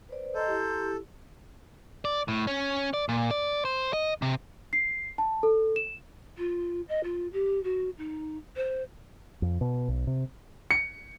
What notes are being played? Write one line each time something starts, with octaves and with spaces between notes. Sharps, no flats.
B4 C5 D5
A4 D#5 A#5 C6 G6
E4 G4
D5
A2
C#4
D5
A#2
D5
C5
D#5
C3
C7
A5
A4
E7
F4
D#5
F4
G4
F#4
D#4
C5
F2
B2
B1
C3
C#7